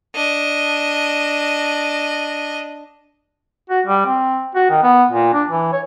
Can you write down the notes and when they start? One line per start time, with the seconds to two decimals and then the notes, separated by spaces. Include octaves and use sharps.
0.15 D4 D#5
3.70 F#4
3.86 G3
4.06 C4
4.55 F#4
4.70 D#3
4.83 B3
5.11 A#2
5.33 D4
5.50 E3
5.72 C#5